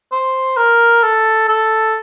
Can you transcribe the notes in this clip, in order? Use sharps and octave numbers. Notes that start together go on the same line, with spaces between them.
C5
A#4
A4
A4